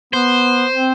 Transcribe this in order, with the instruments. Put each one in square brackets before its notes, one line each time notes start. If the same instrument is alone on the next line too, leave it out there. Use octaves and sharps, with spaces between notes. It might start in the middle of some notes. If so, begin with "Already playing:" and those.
[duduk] B3 [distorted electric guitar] C5
[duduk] C4